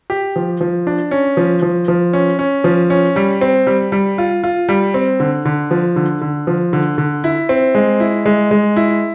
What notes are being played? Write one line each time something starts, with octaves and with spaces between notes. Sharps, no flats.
G4
F3
F3
D4
C#4
F3
F3
F3
C#4
C#4
F3
C#4
G3
C4
G3
G3
F4
F4
G3
C4
D3
D3
F3
D3
D3
F3
D3
D3
E4
C4
G#3
E4
G#3
G#3
E4